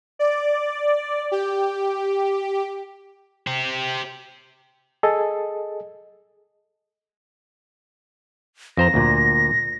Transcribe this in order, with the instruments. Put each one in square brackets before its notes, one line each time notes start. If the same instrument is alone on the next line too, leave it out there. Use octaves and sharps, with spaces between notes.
[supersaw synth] D5
G4
[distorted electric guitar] G4 C5
[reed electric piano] G#4 A4 D#5
[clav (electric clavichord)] F2 C5 A#5 [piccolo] A#6
[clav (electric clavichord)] D2 A#2